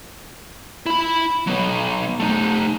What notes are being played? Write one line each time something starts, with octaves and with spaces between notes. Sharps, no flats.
E4 B5
F#3 B3
A3 D#4